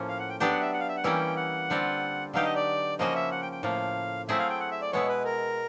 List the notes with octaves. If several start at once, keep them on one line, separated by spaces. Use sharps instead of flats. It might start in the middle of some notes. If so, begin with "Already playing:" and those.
Already playing: A2 F3 A#3 C#4
F5
F#5
G5
F#3 B3 D4 G4 G5
F#5
E5
F#5
F5
E5
F#5
E3 G3 A#3 C#4 E4 G5
F#5
D3 G3 C4 F4
D3 F#3 B3 D#4 G4 F5
D#5
D5
C#3 F3 A#3 C#4 F#4 D#5
E5
F#5
G5
G5
A2 F3 A#3 F5
F#3 A3 C4 E4 G#4 E5
F5
G5
F#5
E5
D5
B2 G#3 B3 E4 C#5
B4
A#4